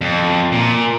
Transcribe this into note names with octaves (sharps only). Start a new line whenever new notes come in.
F2
A#2